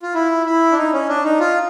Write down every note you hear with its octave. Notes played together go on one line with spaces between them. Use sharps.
F4
E4
E4
D4
D#4
C#4
D4
D#4
F4